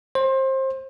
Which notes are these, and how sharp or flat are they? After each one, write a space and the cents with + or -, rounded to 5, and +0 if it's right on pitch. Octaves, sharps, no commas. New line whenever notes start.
C5 +25